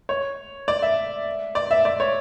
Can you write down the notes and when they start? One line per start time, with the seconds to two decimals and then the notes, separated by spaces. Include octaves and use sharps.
0.09 C#5
0.68 D5
0.82 E5
1.55 D5
1.71 E5
1.85 D5
2.00 C#5